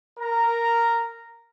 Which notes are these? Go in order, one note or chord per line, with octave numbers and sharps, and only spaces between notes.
A#4 A#5